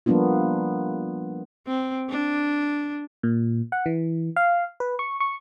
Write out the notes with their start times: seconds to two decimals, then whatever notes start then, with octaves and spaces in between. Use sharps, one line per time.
0.06 F3 G3 A#3 B3 D4 F4
1.67 C4
2.10 D4
3.23 A#2
3.72 F#5
3.86 E3
4.36 F5
4.80 B4
4.99 C#6
5.20 C#6